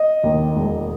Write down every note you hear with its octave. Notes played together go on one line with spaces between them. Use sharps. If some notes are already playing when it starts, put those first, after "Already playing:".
Already playing: D#5
D#2 D#3
E1